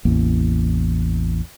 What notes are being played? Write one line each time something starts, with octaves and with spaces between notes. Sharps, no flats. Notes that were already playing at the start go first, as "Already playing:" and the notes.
A1 E2 A#3